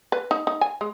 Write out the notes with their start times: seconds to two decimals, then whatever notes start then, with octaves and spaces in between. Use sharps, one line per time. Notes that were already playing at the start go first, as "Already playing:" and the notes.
0.12 B4
0.31 D#4
0.47 D#4
0.61 G#5
0.81 G#3